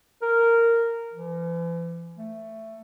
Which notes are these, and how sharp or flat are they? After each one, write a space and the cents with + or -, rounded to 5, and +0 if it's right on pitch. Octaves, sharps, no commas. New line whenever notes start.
A#4 -10
E3 +40
A3 +10